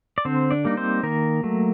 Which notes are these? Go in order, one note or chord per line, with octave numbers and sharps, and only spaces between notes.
D5
D3 C4 C5
D4 D5
G3 A#3 D#4
C4 C5
D#3 A#3 A#4
F#3 A3